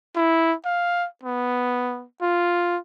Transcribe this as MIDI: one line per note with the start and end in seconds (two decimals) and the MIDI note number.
0.16 0.53 64
0.65 1.06 77
1.23 2.04 59
2.21 2.77 65